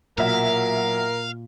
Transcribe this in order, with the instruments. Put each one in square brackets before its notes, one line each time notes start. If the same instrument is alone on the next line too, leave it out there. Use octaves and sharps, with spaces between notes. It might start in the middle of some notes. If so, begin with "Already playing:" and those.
[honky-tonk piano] B1 F#3 E5 [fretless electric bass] A#2 [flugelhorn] A#4 [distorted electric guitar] F5